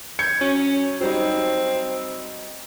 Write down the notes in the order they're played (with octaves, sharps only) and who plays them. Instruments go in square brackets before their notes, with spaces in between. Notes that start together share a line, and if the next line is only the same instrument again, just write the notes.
[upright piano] G6 G#6 C#7
[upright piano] F#3 [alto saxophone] C#4
[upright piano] F#3 G3 D#4 [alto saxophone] C4